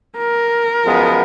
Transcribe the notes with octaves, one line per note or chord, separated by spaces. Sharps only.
A#4
F#2 F3 G#3 B3